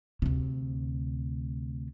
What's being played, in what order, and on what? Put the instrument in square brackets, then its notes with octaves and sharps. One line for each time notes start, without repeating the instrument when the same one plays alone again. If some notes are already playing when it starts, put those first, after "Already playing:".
[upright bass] D2 C3